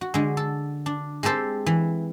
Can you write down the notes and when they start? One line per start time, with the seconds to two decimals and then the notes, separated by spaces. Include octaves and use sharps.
0.01 F#4
0.14 D3 G#3
0.37 A4
0.86 D4
1.23 G#3 C4 G4 A4 C5
1.66 E3